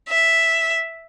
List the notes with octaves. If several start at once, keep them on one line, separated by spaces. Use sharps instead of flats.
E5